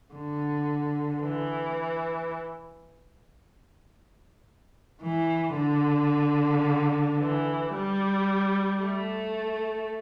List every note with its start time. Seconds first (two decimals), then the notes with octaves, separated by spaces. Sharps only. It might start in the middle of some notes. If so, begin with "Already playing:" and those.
0.14 D3
1.23 E3
5.03 E3
5.58 D3
7.20 E3
7.74 G3
8.83 A3